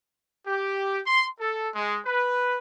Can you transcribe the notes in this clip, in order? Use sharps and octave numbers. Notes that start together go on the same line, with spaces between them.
G4
C6
A4
G#3
B4